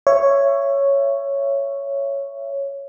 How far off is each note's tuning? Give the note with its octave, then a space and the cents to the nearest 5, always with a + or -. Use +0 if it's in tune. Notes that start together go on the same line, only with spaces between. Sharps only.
C#5 +0 E5 +25